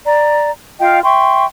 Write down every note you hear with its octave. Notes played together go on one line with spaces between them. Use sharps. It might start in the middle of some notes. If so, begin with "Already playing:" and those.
D5 A#5
F4 D#5 F5 G5
E5 G5 C6 C#6